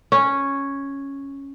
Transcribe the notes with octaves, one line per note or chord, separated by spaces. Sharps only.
C#4